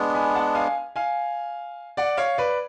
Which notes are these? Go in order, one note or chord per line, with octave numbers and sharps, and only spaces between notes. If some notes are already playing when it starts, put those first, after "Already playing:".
Already playing: G#3 B3 D4
G#5 B5
F#5 A5
F5 G#5
F5 G#5
D5 F#5
C#5 F5
B4 D5